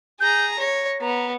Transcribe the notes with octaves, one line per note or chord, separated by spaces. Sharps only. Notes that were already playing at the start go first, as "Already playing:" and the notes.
G#4 A#5 G6
C#5 A#6
B3 A#5